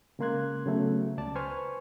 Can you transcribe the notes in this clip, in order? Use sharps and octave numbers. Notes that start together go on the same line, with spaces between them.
C#3 G#3 A#3 C6 F#6 G#6
C#3 F#3 A3 B3
C#2 D5 A5
B4 C5 G#5 C#6 F6